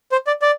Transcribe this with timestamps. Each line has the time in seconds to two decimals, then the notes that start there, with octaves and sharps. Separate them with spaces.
0.12 C5
0.27 D5
0.42 D5